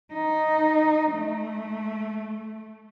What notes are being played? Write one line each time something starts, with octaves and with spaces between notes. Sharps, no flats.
D#4
A3